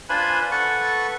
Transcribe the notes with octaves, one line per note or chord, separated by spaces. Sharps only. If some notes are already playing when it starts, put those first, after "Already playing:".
D4 F4 B4 C5 G#5 B5
A4 B4 F#5 C#6